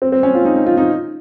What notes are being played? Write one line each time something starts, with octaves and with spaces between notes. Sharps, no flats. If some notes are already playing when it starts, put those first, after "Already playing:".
C4
C4
C#4
F4
D#4
D#4
F4
D#4